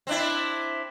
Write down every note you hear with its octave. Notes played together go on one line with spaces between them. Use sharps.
C4 D4 E4